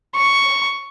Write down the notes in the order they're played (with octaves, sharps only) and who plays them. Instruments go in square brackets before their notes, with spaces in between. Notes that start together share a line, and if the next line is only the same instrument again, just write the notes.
[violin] C#6